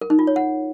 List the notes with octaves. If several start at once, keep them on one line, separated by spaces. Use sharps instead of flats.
A#4
D#4
F4
C#5
F#5